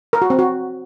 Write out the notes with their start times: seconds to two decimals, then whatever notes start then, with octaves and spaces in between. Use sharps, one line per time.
0.13 A#4
0.22 F#4
0.30 C4
0.39 F#4